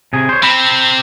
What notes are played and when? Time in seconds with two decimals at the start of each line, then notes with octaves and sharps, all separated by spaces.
0.13 C3 G#4
0.29 C5 C#5
0.43 C3 C4 B5